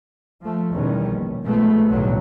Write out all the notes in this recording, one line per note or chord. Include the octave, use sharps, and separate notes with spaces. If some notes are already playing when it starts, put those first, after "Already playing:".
F3 A3
E2 B2 D#3 G3 C#4
A#1
B1 G#2 F3 G#3 A3 B3
B1 E2 A2 D3 F#3 G3